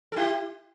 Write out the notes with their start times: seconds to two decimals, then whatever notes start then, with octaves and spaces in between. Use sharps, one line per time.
0.12 A4
0.16 E4 G4